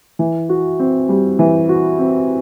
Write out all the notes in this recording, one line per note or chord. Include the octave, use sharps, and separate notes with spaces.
E3
F#4
C4
G3
E3
F#4
C4